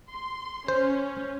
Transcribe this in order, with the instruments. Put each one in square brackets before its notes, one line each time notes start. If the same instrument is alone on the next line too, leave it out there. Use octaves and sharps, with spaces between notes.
[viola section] C6
[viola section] C#4 [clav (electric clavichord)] C5